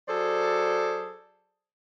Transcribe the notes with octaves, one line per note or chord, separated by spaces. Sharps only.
F#3 G#4 A4 C5 D5